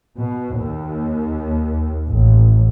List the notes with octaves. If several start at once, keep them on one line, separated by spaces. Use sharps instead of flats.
B2
D#2
A1